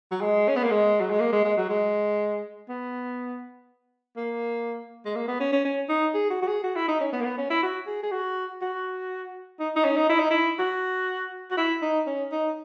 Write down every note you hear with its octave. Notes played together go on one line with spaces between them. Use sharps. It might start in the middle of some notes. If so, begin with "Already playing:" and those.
F#3
G#3
C#4
B3
A#3
G#3
F#3
G#3
A#3
G#3
G#3
F#3
G#3
B3
A#3
G#3
A#3
B3
C#4
C#4
C#4
D#4
G#4
F#4
F#4
G#4
F#4
E4
D#4
C#4
B3
A#3
B3
C#4
E4
F#4
G#4
G#4
F#4
F#4
D#4
D#4
C#4
D#4
E4
D#4
E4
F#4
F#4
E4
D#4
C#4
D#4